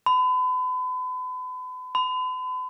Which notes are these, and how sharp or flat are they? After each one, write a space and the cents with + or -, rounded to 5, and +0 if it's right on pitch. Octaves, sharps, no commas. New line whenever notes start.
B5 +40
B5 +45